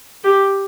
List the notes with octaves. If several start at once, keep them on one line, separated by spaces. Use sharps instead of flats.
G4